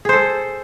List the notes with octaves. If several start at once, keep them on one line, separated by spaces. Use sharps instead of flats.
G#4 A4 C5